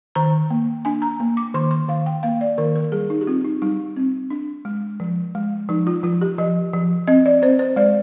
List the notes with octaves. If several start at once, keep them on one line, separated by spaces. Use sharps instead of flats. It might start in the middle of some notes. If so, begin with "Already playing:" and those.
D#3 A#5
A#3
D4 G#5
A#5
A#3
D6
D#3 C6
C6
D#3 F5
G5
A#3 F5
D5
D#3 A#4
A#4
G3 G#4
D#4
G4
C4 F4
D#4
G3 D#4
C4
D4
G#3
F3
G#3
F3 D#4
F4
F3 F4
G4
F3 D#5
F3
C4 D#5
D5
C4 C5
C5
G#3 D5